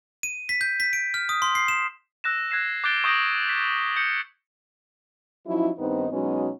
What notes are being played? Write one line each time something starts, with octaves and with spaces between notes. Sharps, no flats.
D#7
B6
G6
B6
D7
F6
D#6
C6
C7
E7
E6 F#6 A#6 E7
F#6 G#6 A#6 C7 E7
D6 F#6 G6 A6 D7 G7
C#6 D#6 G6 A#6 D7
B6 E7
G6 C#7
F3 F#3 C#4 D#4 E4
G2 D#3 B3 C4 D#4
B2 F#3 G#3 B3 C#4 D#4